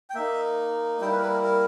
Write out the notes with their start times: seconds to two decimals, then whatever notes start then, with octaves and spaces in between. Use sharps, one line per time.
0.10 G5
0.15 A#3 D#4 E5
1.01 G3 A#3 E4 G5
1.12 B4
1.17 A#4
1.23 B4
1.33 A#4
1.44 A#4